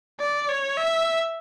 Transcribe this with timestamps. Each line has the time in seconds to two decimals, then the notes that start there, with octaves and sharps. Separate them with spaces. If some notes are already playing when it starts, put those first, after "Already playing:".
0.20 D5
0.49 C#5
0.78 E5